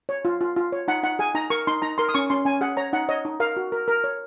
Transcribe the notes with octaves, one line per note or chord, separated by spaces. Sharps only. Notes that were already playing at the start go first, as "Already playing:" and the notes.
C#5
F4
F4
F4
C#5
D#4 F#5
D#4 F#5
G#4 G#5
D#4 A#5
A#4 C#6
D#4 C6
D#4 A#5
A#4 C6
D#6
C#4 C#6
C#4 C6
C#4 G#5
G#4 F#5
C#5 A#5
D#4 F#5
C#5 D#5
D#4
A#4 F5
F#4
A#4
A#4
C#5